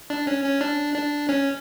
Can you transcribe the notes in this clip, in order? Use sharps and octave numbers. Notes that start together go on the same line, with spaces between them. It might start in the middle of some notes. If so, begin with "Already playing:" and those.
D4
C#4
C#4
D4
D4
C#4